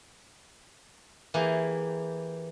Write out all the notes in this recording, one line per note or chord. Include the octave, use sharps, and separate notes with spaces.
E3 A#3 G4 G#4